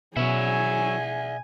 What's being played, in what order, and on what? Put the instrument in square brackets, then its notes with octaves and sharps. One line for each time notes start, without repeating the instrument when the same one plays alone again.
[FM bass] B2 [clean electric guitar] F#3 C#4 E4 [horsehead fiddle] G#4 G#5 [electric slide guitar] D5 E5